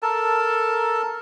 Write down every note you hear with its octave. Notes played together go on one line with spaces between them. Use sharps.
A4 A#4 A5